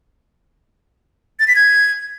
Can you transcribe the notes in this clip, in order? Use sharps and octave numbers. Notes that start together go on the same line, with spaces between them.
A6
B6
G#6